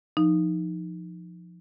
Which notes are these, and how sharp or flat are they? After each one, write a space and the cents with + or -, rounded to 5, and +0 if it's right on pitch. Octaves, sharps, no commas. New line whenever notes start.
F3 +0 D#4 +0